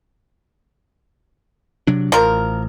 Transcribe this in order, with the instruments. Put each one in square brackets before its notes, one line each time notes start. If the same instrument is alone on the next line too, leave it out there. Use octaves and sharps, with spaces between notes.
[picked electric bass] C3 F#3 D4
[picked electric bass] A1 [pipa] F3 A#4